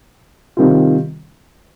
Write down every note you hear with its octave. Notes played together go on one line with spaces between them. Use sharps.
C3 D#3 G3 C4 F4